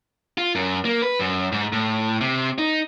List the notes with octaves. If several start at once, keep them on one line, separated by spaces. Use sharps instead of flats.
F4
F#2
A#3
B4
F#2
G#2
A2
C3
D#4